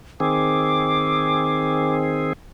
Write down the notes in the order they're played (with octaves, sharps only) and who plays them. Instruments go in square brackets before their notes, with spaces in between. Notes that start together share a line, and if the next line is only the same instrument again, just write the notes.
[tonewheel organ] D#3 C4 G#4 [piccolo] D6